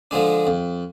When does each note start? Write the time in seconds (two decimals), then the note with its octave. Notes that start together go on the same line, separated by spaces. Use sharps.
0.11 D3 F3 G#3 D4
0.47 F2